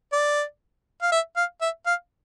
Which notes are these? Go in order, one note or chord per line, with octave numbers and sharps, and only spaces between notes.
D5
F5
E5
F5
E5
F5